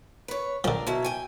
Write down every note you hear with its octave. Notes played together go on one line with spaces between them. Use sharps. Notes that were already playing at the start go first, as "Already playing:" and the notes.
B4 C#5
D3 F3 D4 A#4
B2 F#3 E4
G5 G#5